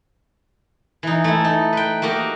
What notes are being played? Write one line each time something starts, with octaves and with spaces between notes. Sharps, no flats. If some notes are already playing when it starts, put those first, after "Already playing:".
E3 D#4
A3 E4
D#4
B4 G5
A#3 F#4 G4 D#5 A#5